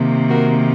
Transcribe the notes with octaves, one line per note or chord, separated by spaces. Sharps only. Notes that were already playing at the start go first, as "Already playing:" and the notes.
Already playing: C3 D#3 A#3
F#4 A#4